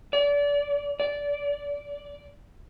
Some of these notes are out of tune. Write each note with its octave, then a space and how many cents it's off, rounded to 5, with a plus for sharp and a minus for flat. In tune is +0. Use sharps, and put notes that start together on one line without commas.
D5 -30
D5 -20